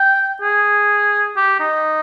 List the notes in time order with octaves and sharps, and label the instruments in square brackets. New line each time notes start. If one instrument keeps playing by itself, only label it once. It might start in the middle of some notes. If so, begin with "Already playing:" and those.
Already playing: [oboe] G5
G#4
G4
D#4